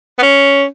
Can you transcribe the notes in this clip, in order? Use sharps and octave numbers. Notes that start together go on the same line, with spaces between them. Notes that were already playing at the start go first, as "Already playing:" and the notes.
B3
C#4